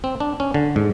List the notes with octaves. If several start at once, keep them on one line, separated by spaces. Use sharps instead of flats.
C4
D4
C#4
D3
G#2